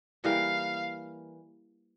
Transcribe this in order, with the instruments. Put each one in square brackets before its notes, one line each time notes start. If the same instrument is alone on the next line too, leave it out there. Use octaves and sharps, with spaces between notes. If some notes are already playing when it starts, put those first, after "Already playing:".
[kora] E3 G3 A#3 [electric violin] F5